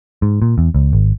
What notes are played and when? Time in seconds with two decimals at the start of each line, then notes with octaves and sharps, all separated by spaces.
0.22 G#2
0.42 A#2
0.58 E2
0.74 C#2
0.93 G#1